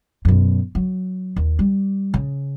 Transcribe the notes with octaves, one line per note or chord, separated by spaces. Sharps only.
F#2 B2
F#3
D#2
G3
C#3